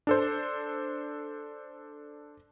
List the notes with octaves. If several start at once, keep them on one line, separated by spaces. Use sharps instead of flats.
D4 A4 C5